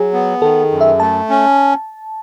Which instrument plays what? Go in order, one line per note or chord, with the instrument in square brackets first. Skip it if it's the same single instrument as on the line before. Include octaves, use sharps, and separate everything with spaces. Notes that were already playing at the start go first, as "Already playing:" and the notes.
Already playing: [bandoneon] F#3 [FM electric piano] G#4
[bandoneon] B3
[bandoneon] D#3 [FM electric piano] A4
[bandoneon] F#2
[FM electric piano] E5
[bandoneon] A3 [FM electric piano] A5
[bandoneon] C#4